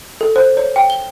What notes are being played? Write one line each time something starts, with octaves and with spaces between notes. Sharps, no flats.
A4
C5
C#5
G5
G7